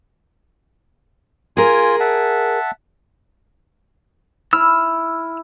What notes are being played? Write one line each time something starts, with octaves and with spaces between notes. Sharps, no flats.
F4 G#4 A#4 G#5
E5 F#5 A5
E4 E6 F6